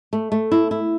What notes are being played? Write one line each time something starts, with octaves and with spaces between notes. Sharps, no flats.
A3
A3
E4
E4